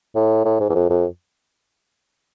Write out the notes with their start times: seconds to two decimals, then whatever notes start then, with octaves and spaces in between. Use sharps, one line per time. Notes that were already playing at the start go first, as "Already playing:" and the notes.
0.16 A2
0.45 A2
0.61 G#2
0.70 E2
0.75 F2
0.90 F2